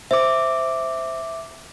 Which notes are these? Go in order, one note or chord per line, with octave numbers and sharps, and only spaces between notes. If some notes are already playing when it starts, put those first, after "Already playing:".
C5 E5 D6